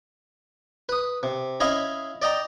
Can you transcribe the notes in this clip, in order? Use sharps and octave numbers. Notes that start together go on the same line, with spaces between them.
B4 D#6
C3
C#4 E4 D#5 F5 B5
D5 D#5 G5 A#5